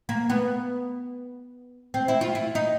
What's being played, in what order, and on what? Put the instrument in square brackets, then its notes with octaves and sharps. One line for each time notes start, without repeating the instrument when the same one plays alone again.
[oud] A#3
B3
C4
E4
F4
E4
D#4